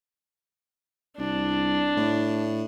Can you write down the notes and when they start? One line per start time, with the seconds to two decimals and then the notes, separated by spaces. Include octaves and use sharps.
1.18 C2 D4
1.97 A2